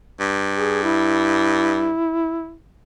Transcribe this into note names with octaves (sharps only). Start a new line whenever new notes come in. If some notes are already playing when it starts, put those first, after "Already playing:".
G2
G#4
E4